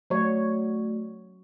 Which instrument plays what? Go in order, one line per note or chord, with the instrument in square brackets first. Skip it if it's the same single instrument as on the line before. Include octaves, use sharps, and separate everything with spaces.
[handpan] F#3 C#5 [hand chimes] A3 F#4 D5